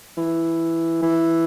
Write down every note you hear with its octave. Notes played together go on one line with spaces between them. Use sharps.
E3
E3